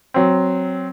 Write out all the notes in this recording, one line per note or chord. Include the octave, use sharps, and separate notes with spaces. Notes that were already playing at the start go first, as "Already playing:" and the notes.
F#3 C4